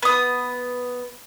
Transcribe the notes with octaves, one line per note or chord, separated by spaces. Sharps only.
B3 D#6